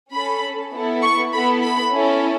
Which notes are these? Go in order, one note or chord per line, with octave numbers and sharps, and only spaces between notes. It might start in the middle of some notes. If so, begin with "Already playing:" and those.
C#4 A4 B5
B3 E4 A4
C#6
B3 E4 A4 B5
B5
C#4 E4 A4